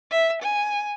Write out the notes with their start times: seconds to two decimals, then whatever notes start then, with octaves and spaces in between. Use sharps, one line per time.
0.11 E5
0.42 G#5